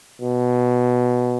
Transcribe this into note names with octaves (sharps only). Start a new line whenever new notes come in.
B2